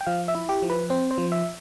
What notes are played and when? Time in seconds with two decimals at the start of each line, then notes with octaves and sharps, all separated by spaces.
0.01 G5
0.06 F3 F5
0.28 E5
0.35 E4
0.49 G4
0.62 F3
0.70 B4
0.90 C4 C5
1.11 C5
1.18 F3
1.32 E5